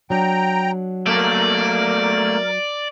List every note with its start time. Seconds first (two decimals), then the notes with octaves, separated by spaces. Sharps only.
0.10 F#3 D4 G5 A#5
1.07 A3 A#3 A#4 D5